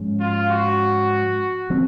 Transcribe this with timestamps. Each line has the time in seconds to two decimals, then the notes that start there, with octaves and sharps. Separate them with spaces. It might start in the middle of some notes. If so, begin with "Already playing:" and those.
Already playing: G#2 F3 G#3 C#4
0.21 F4
0.50 F#4
1.70 F3 C4